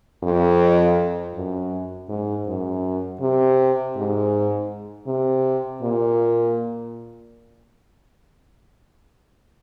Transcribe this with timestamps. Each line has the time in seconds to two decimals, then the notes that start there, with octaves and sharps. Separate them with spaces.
0.23 F2
1.34 F#2
2.09 G#2
2.47 F#2
3.21 C3
3.96 G#2
5.07 C3
5.82 A#2